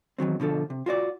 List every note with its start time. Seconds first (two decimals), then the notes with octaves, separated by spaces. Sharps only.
0.18 E2 D#3 F#3 C4
0.40 B2 D3 F3 A4
0.70 C3
0.86 F4 F#4 C#5 D5